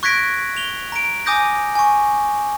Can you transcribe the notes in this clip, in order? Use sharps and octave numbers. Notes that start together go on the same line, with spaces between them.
C#6 F#6 G#6 A#6 B6 D7
F7 G7
A#5 D7
G#5 D6 D#6 G6 A#6
G#5 C#6